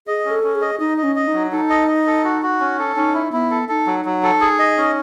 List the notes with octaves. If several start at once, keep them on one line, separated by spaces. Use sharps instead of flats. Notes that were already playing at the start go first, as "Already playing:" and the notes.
G#4 D#5
C#4
A4
C#4
G#4
D#5
D#4 D#5
D#5
C#4
D#5
D#4
F#3
D#4 A4
D#5
D#5
A4
F#4
F#4
C#4
A4
C#4 D#4
E4
B3 E4
A4
D#4 A4
F#3
F#3
A4
G#4
D#5
C#4